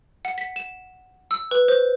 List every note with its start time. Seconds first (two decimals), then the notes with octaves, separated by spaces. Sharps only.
0.25 F#5
0.38 B6
0.56 E7
1.31 E6
1.51 B4
1.68 C5